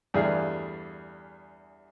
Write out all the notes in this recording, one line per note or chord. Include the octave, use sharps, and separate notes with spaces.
E2 G2 G3 A3 G#4 F5